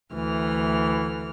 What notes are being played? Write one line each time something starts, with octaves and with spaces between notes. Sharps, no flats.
D2 E3 F6